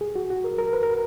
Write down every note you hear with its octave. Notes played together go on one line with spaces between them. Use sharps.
G#4
F#4
F#4
A#4
A#4
B4
A#4